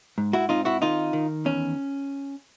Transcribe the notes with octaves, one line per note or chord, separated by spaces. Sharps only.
G#2
E4 F#4
C4 D#4 F4
E4 F#4
D#3 D#4 F4
D#3
E2 C#4